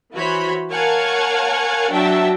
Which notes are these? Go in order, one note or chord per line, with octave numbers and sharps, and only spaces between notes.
E3 F#4 C5 C#5 B5
A#4 C#5 F5 F#5 G#5 A5
F#3 D4 F#4 E5 G5 A5